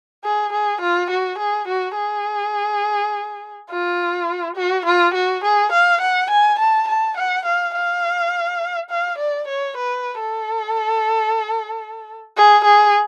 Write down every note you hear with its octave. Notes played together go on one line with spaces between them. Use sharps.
G#4
G#4
F4
F#4
G#4
F#4
G#4
F4
F#4
F4
F#4
G#4
F5
F#5
G#5
A5
A5
F#5
F5
F5
F5
D5
C#5
B4
A4
G#4
G#4